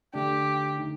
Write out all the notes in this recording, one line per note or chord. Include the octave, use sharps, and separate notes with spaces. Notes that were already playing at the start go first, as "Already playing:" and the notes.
D3 A3 D4 G4
D3 A3 D#4